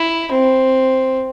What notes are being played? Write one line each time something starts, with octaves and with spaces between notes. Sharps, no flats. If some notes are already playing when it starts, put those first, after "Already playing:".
Already playing: E4
C4